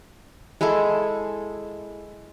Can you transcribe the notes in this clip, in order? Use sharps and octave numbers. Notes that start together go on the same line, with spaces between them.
G#3 E4 G#4 A4